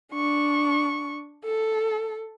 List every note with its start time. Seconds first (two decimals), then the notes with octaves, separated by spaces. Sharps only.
0.13 D4 C#6
1.44 A4